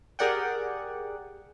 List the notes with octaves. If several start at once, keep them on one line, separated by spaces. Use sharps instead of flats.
G4 G#4 A#4 D5 F#5 G5